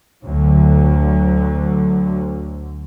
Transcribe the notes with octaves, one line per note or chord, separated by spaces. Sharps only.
D2 D3 F#3